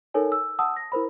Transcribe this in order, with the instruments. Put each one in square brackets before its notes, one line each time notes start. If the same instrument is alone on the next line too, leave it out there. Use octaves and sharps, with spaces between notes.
[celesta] D#4 A4 A#4 C#5 G#5
E6
F#5 A5 D#6 E6
A#6
E4 A#4 C5 B5